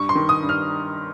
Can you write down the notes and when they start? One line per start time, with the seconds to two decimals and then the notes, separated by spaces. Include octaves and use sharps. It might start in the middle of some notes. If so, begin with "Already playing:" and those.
Already playing: G2 C#6
0.09 C6
0.15 D#3
0.29 D#6
0.43 G2
0.49 F6